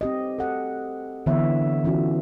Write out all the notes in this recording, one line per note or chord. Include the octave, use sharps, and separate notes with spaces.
C4 G4 D#5
A4 F#5
D3 E3 B3 C#5 E5
E3 C#4 F4 F#4